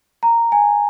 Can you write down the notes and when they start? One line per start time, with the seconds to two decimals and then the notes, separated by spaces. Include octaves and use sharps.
0.23 A#5
0.52 G#5